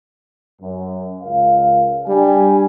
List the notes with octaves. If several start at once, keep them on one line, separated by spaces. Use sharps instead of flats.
F#2
C#2 A#4 F5
G3 D4 G#5